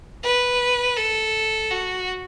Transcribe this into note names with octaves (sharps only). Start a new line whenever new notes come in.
B4
A4
F#4